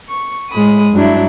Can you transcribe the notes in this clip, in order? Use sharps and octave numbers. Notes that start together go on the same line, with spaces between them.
C#6
A2 G#3 B5 D#6
G2 F#3 D4 E4